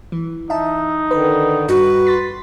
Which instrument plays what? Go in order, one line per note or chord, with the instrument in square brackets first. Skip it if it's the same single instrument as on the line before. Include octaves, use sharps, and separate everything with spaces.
[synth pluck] E3
[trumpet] D#4 [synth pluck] E5 A5
[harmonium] D3 D#3 [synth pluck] B4
[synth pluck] G2 [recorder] F#4 [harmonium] B4
[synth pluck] C6 A6 B6